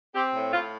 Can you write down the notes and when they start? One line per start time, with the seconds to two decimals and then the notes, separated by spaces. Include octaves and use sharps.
0.15 C4 G4
0.34 A2
0.53 A2 F4